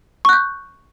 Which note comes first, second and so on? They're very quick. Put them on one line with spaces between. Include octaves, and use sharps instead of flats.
C#6 F#6 G6